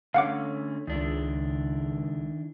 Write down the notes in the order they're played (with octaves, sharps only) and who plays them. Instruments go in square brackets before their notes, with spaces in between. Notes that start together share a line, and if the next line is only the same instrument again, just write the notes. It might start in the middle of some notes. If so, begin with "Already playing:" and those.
[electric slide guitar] D3 A3 C#4 [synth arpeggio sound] F5 F#5 D6
[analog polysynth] C#2 [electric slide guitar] D#3 D4 E4